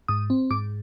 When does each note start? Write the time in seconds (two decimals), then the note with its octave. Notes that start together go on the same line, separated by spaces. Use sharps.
0.08 G#2 D#6
0.30 C4
0.51 G#2 D6